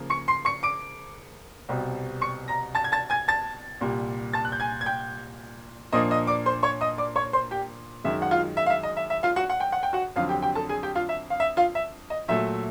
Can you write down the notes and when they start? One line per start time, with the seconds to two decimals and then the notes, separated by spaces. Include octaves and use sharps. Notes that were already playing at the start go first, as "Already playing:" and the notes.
Already playing: C#3 F3 A#3
0.10 C#6 C#7
0.28 C6 C7
0.45 C#6 C#7
0.63 D6 D7
1.69 C2 B2 G3 C4
2.21 C#6 C#7
2.48 A#5 A#6
2.75 A5 A6
2.84 G#6
2.92 A5 A6
3.10 G#5 G#6
3.28 A5 A6
3.81 C2 A#2 G3
4.33 A5 A6
4.45 F#6
4.52 G6
4.60 G#5 G#6
4.81 G#6
4.86 G5 G6
5.92 A#2 F3 A#3 D4 D#5 D#6
6.11 D#5 D#6
6.27 D5 D6
6.46 C5 C6
6.63 C#5 C#6
6.81 D#5 D#6
6.98 D5 D6
7.16 C#5 C#6
7.33 C5 C6
7.51 G4 G5
8.04 F#2 D#3 G#3 E5
8.22 F#5
8.31 F4 F5
8.57 E5
8.66 F5
8.70 E5
8.83 D#5
8.97 E5
9.10 E5
9.23 F4 F5
9.36 F#4 F#5
9.50 F#5
9.60 G5
9.72 F#5
9.83 G5
9.93 F#4 F#5
10.16 F2 D3 F#3 F4 F5
10.29 G4 G5
10.43 G4 G5
10.55 A4 A5
10.69 G#4 G#5
10.83 G4 G5
10.95 F4 F5
11.09 E5
11.30 F5
11.40 E5
11.57 F4 F5
11.75 E5
12.10 D#5
12.28 A#2 F#3 A3 E5